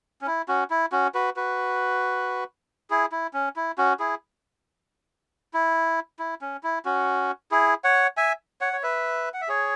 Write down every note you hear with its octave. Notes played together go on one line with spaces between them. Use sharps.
C#4
E4
C#4 F#4
E4
C#4 F#4
F#4 B4
F#4 B4
E4 G#4
E4
C#4
E4
C#4 F#4
E4 G#4
E4
E4
C#4
E4
C#4 F#4
E4 G#4
C#5 F#5
E5 G#5
C#5 F#5
C#5
B4 E5
F#5
E5
G#4 C#5